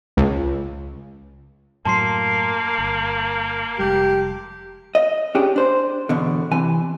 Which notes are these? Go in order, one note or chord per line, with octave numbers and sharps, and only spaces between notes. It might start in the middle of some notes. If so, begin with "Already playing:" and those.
C#2
F#2 A2 F#3 A#3 A5 C6 C7
G1
F1 G3 G#3 G4
D#5
C#4 D4 G4 G#4
D4 C5
E2 B2 D3
C3 E3 G#5